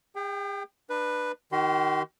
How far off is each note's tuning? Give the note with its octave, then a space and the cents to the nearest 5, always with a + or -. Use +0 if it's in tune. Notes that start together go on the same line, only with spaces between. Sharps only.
G#4 -45 G5 +0
D4 +30 B4 +0
D#3 +0 F#4 +45 C6 -25